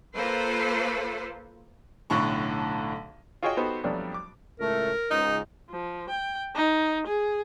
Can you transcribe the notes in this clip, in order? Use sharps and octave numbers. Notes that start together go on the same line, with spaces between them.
A#3 F4 A4 B4 C5
B1 A2 D3 A5 C#6
F4 F#4 G#4 C#5 D#5 G5
B3 D#4 F#4 G4 A4 C5
F2 F#3 G3 A3 B3 D4
D6
C#2 A2 A3 A#4
C#2 G#2 D#4
F3
G5
D#4
G#4